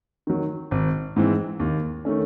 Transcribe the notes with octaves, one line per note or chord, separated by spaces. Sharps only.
D#3 F#3
G#1
G#2 E3 C4
D#2
D#3 A3 C#4